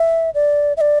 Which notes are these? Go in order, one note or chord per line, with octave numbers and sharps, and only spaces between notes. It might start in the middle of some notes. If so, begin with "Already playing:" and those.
Already playing: E5
D5
E5
D5